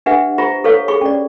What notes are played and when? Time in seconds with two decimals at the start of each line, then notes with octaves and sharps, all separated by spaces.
0.06 D4 G4 B4 E5 F#5
0.38 F4 G4 C5 A#5 C#6
0.64 G4 A4 B4 C#5 F5 C#6
0.88 G4 G#4 B5 C#6
1.01 C#4 D5